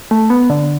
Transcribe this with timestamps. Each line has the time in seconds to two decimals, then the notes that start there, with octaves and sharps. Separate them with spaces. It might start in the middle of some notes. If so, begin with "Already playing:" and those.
0.11 A3
0.30 B3
0.50 D3